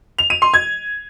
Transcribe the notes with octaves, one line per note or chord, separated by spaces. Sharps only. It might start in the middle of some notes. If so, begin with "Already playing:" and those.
F7
D#7
C6
G#6